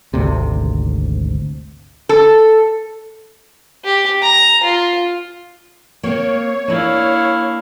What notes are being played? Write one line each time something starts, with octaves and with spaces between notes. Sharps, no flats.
G#1 D2 C3
A4
G4
A#5
F4
A#3 C4 C#5
A#3 D4 E4 F5